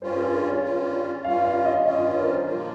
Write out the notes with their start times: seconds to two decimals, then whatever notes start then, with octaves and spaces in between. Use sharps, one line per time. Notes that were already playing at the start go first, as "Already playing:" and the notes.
0.02 G2 G3 C#4 F4 C5
0.17 G#4
0.32 A#4
0.48 C#5
0.63 G2 G3 C#4 F4
1.25 G2 G3 C#4 F4 F5
1.44 F5
1.65 D#5
1.85 G2 G3 C#4 F4 D#5
2.06 C#5
2.20 A#4
2.26 C5
2.46 A#2 F3 A#3 F4 A#4